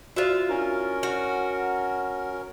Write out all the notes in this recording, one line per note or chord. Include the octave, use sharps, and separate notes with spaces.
F4 F#4 C5 D5 E5
C#4 D4 E4 A#4
F#4